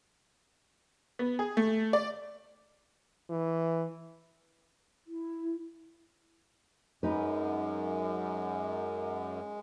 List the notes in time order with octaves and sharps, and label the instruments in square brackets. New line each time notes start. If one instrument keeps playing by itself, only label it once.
[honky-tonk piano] B3
G#4
A3
D5
[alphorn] E3
[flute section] E4
[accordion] F#2 [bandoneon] G#3 [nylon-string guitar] D#4 B4